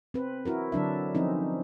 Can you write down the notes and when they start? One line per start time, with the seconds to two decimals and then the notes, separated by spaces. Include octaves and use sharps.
0.14 C4 B4
0.45 E4 F#4 A#4
0.72 D3 F#3 D4 E5
1.15 F3 C4 C#4 D#4